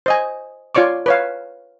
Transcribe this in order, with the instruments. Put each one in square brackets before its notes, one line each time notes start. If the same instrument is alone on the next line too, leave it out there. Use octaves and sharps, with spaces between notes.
[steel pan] C5 D#5 G#5
F4 C#5 D5 C#6 D6
B4 C#5 F5